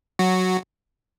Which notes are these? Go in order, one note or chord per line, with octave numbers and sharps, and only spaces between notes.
F#3 F#4